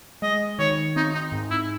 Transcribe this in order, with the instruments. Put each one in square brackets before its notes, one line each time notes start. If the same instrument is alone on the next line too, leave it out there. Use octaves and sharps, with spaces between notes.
[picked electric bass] G#3 [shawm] D#5
[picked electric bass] D#3 [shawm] C#5
[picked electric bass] C4 [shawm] D#4
[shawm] D#4
[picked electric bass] G#2
[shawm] E4